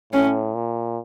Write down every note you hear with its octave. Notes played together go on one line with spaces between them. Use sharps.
A2 C#4
A#2